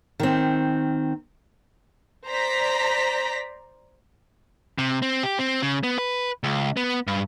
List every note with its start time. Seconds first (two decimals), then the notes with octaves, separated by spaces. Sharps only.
0.20 D#3 C4
2.27 C5 D5 A#5 A#6 B6
4.78 C3
5.02 C4
5.23 G4
5.39 C4
5.62 C#3
5.83 B3
5.98 B4
6.43 C#2
6.77 B3
7.07 G2